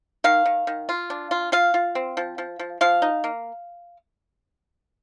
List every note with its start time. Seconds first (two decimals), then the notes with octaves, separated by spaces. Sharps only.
0.24 D#3 F5
0.46 D#3
0.67 D#3
0.89 F4
1.10 D4
1.31 F4
1.52 F4 F5
1.74 F4
1.95 C4
2.17 F3
2.38 F3
2.59 F3
2.81 F3 F5
3.02 D#4
3.24 A#3